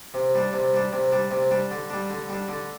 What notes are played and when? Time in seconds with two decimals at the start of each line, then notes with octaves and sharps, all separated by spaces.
0.14 C3
0.35 G3 D4
0.53 C3
0.74 G3 D4
0.93 C3
1.12 G3 D4
1.31 C3
1.51 G3 D4
1.71 D3
1.90 G3 D4
2.10 D3
2.29 G3 D4
2.48 D3